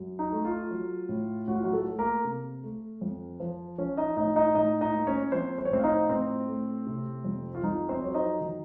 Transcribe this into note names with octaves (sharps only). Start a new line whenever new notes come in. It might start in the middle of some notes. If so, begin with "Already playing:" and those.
Already playing: F#2
D#4
A3
F4
F#3
A2
A2 F#4
F4
F#3 F#4
A3 A4
A3
A#3 A#4
C3
A3
F2
F3
F3 C#4 C#5
D#4 D#5
A2 D#4 D#5
D#4 D#5
A2 D#4 D#5
D#4 D#5
A#3
C#4 C#5
F3 C4 C5
C5
C#5
A2 C4 C5
F5
D#4 D#5
A2 C4 C5
A3
C3
F2
F4
F2 D#4
C4 C5
F#3 C#5
D#4 D#5
D#3